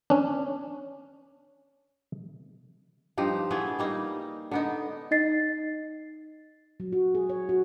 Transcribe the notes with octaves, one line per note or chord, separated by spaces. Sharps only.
C#4 D4
G2 F3 D#4 G4
E3 A3 B3 G#4
G3 A#3 D#4
D3 B3 D#4
D#4 D#5 A6 C7
F#3
F#4
G#4
C#5
F#4